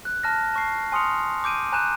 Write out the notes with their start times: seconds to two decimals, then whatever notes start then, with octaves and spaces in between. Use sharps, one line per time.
0.05 F#6
0.23 A5 F6 A#6
0.53 A5 C#6 C7
0.92 G#5 C6 D#6 F6 C#7 F7
1.44 D6 G6 D7 D#7
1.72 G#5 A#5 F#6 G6 D#7 E7